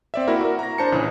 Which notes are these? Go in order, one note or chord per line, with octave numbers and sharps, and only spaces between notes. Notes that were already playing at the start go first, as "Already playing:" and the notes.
C4 D5 E5
A#3 E4 F#4 A#4
F#4 A#4
A#5 A#6
D4 C5 A5 C#7
A#1 C#3 E3 G#4